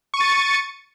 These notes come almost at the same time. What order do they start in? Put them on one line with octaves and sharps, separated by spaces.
C#6 D#7 A6 C#7